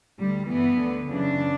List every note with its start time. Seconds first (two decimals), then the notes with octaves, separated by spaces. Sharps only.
0.19 D2 D3 G3
0.49 G2 E3 B3
0.79 D2 D3
1.09 F#2 C#3 E3 D4